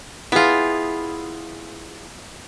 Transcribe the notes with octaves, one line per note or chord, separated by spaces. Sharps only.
B3 E4 F4 G#4